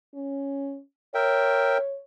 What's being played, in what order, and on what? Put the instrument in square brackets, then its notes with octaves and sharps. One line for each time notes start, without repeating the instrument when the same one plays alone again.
[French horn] C#4
[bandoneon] A#4 E5 G5 [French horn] C#5